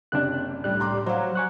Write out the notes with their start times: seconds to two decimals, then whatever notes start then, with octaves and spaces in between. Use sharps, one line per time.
0.12 F#1 C3 D4 F#6
0.64 C2 A2 G3 F#6
0.80 A#5 C6 D6
1.06 F#3 C5 F5 F#5 A#5
1.35 G#5 C#6 F#6